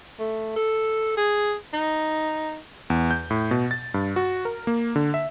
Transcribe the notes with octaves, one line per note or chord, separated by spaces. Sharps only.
A3
A4
G#4
D#4
E2
G6
A2
B2
A6
G2
F#4
A#4
A#3
D3
E5